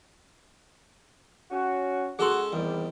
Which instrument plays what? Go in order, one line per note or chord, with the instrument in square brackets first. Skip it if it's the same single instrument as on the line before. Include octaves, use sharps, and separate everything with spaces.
[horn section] C#4 F#4
[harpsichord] G#3 C#4 A4 [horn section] F#4 [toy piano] G#4 C6
[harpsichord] E2 [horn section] C3 D#3 G3